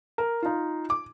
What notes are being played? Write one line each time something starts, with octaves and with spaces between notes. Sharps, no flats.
A#4
D#4 F4
D6